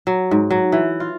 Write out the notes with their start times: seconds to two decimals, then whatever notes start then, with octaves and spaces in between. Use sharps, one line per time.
0.07 F#3
0.31 G#2
0.50 F#3
0.72 E3
1.00 F4